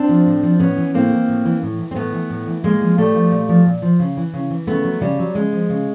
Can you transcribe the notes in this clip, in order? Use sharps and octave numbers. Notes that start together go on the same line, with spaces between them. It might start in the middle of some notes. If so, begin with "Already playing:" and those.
Already playing: C4 D4
F3
A2
F3
A2 B3 C#4
E3
A2 A#3 C4
E3
A2
E3
A2
E3
C4
A2 A3 B3
E3
A2
E3
A2 G#3 A#3
F3
A2 G3 A3
F3
A#2
F3
A#2
F3
C#3
E3
C#3
E3
C#3 A3 B3
F#3
C#3 G3
F#3
C#3 G#3
F3
C#3